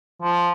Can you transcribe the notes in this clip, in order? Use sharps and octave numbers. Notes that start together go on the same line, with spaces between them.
F3